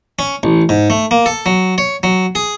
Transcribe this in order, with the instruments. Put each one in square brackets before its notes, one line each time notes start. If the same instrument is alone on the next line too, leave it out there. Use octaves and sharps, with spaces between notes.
[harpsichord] C#4
A1
G#2
A3
A#3
A4
F#3
C#5
F#3
G#4